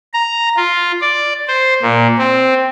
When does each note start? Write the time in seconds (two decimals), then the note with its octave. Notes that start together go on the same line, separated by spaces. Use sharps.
0.14 A#5
0.57 F4
1.01 D5
1.48 C5
1.83 A#2
2.19 C4